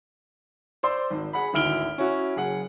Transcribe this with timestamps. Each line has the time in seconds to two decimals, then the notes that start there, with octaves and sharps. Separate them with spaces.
0.83 C5 D5 C6 E6
1.11 G#1
1.33 G#4 F#5 B5
1.53 G#1 D2 E4 F6 D7 G7
1.98 C#4 E4 F#4
2.36 F#1 G#4 F#5